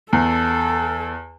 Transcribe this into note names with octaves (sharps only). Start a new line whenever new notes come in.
E2 A4